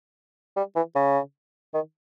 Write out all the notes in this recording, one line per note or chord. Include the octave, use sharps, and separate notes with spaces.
G3
E3
C#3
D#3